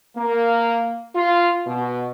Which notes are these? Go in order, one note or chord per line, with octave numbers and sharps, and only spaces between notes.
A#3
F4
B2